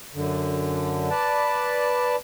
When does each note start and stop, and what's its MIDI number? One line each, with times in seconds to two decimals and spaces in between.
0.15 1.09 42
0.15 1.09 50
1.11 2.16 71
1.11 2.16 74
1.11 2.16 81